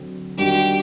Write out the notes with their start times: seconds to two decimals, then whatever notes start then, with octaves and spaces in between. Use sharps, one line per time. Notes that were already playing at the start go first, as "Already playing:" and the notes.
Already playing: D3 F#3 C4
0.38 D#3 G3 D4 F#4 G4